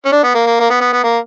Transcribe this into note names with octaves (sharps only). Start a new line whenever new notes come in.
C#4
D4
B3
A#3
A#3
A#3
B3
B3
B3
A#3